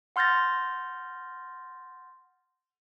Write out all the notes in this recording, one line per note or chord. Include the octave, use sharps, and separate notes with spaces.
F#5 C6 F6 G6 A6 A#6